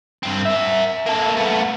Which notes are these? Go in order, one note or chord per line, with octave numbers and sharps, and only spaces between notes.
G2 C4
A#4 E5
A#3 A4
A3 B3